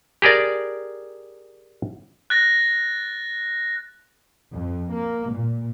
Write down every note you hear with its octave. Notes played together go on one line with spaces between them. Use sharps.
G4 G#4 A#4 D5
F#6 A6 A#6
F2
A#3
A#2